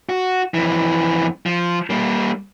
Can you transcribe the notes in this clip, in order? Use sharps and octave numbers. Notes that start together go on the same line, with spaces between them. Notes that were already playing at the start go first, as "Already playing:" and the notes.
F#4
F2 E3
F3
G3 A#3